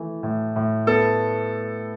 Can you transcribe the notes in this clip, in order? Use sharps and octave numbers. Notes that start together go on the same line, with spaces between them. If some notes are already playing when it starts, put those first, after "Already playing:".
Already playing: E3 A3
A2
A2
B3 A4